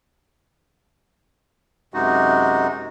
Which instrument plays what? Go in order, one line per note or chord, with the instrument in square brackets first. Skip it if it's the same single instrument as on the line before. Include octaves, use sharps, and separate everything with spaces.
[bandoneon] F#2 C3 G#3 D#4 F#4